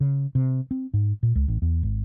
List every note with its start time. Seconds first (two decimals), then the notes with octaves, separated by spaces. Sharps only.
0.01 C#3
0.35 C3
0.71 C4
0.94 G#2
1.23 A#2
1.35 C#2
1.48 A1
1.62 E2
1.83 G#1